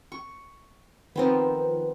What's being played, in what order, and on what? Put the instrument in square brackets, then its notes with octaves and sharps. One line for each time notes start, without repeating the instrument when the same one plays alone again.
[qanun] C#6
[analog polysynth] D#3 F3 [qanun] B3 C4 A#4 [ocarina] B4